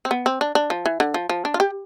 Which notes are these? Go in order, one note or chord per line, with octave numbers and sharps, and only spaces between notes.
C4
B3
C4
D4
D4
F3
E3
D3
F3
F3
D4
F4
G4